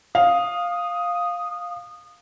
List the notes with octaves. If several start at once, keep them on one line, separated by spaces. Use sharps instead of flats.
F5 D#6